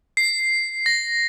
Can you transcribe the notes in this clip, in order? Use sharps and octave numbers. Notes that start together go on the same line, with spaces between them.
C7
A#6